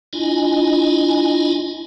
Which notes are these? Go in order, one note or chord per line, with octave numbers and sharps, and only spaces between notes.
D4 E4 F4 D#5 G#5